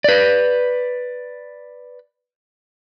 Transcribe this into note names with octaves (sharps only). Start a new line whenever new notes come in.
B4 D5